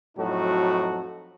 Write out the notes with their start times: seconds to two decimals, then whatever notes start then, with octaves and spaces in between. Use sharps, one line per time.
0.18 F2 A2 F#3 D#4 F#4 A4